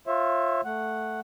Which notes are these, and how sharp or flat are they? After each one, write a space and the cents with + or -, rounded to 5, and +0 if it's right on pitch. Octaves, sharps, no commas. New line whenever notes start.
F4 +0 C#5 -40 E5 +0
A3 +0 F#5 +0